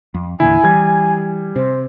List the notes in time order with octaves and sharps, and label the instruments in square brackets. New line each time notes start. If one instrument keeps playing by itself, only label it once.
[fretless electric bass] F2
[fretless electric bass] E2 A#2 D3 [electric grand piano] E4 [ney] G#5
[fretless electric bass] E3 [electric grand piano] G3 G#6
[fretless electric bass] C3 [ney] C5